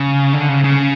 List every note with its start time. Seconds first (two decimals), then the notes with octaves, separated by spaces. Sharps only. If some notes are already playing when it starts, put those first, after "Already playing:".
Already playing: C#3
0.33 D3
0.49 C#3
0.64 C#3